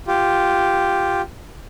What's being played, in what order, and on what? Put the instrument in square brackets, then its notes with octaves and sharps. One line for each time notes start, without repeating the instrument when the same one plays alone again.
[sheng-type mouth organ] F4 G4